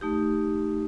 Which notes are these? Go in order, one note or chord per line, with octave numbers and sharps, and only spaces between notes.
A3 D#4 G4